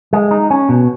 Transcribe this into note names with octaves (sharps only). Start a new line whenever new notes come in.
G#3
D#4
C#4
B2